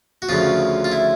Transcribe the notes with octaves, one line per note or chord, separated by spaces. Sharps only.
F#4
D2 C#3 F3 F4
F4
E4